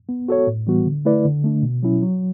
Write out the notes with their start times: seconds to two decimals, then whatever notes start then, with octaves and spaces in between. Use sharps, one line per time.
0.09 B3
0.28 F#4 A4 C#5
0.47 A2
0.67 E3 G3 B3 F#4
0.86 D3
1.05 A3 E4 B4 D5
1.25 D3
1.44 A3 D4
1.63 B2
1.83 F#3 C#4 E4
2.02 F#3